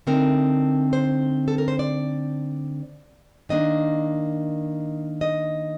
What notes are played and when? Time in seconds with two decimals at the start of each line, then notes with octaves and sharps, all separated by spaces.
0.07 D3 A3 C4 D#4 A#4
0.93 C5
1.48 A4
1.58 A#4
1.68 C5
1.79 D5
3.49 D#3 A#3 D4 D#5
5.21 D#5